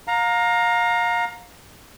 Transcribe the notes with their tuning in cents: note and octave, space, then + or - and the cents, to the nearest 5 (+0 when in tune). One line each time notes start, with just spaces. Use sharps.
F5 +30 A#5 +0